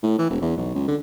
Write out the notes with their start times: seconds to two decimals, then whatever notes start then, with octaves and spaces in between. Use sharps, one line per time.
0.03 A2
0.18 E3
0.30 E1
0.41 E2
0.57 B1
0.74 C#2
0.88 D3